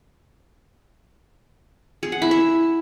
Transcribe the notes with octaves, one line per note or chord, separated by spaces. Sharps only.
G#4
F#5
E4
E5